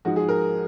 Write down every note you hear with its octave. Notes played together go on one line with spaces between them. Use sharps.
G#2 F3 G#3 F#4
G#4
A#4